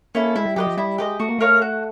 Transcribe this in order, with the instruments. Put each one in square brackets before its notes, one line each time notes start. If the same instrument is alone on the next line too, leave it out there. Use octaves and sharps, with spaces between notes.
[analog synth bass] A#3 [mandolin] C#4 E4 A4
[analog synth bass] G#3 [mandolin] E4
[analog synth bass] G3
[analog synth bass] F#3 [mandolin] G4 B4 D#5
[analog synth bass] F3
[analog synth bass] G3 [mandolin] E4
[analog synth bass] G#3 [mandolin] G4 B4 D#5
[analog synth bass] A3 [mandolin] F#4
[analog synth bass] A#3
[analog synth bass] A3 [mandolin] A#4 C#5 F5
[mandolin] F#4